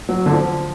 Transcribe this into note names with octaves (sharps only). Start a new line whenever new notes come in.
F#3
D3
F3